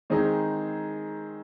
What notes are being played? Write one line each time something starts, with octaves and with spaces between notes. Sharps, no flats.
D#3 G#3 C4 D#4 G#4